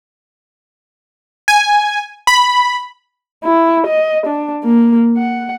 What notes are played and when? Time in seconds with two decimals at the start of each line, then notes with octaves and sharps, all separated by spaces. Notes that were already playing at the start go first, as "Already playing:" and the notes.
1.48 G#5
2.27 B5
3.44 E4
3.87 D#5
4.26 D4
4.64 A#3
5.18 F#5